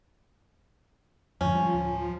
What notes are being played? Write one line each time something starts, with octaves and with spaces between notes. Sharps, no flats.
F2 G#2 D3 F3 C#4
G3
D1